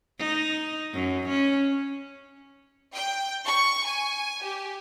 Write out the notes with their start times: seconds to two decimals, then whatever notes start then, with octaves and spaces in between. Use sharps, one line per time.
0.19 D#4
0.94 F#2
1.28 C#4
2.95 G5
3.46 C#6
3.87 G#5
4.42 G4